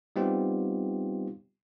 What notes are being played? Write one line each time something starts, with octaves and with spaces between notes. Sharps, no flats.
G3 B3 C4 D#4 F4 G4